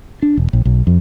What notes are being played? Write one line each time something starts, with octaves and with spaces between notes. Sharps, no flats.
D4
E1
A#1
B1
F2